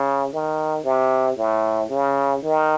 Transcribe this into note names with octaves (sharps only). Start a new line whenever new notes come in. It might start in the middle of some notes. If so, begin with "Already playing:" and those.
Already playing: C#3
D#3
C3
A2
C#3
D#3